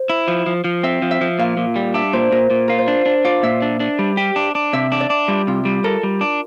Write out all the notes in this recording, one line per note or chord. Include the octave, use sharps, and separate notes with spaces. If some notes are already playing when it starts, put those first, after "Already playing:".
Already playing: C5
E4
F3
F3
F3
C4 E5
F3
E5
F3
A#2 F5
A#2
G3
D4 E5
A#2 C5
A#2 A#4
A#2
F4 A#4
C5
D4
D4
F4 D5
A#2 E5
D4
D4
G3
G4
D4
D4
C3 E5
D4
D5
D4
G3 F4
C3 F4
G3
A4 A#4
G3
D4